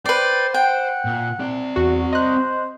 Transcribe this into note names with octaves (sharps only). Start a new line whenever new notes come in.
B4 C5 D5 G5
F#5 G5
A#2
C4 D5
E2 F#4
C5 D#5 F#6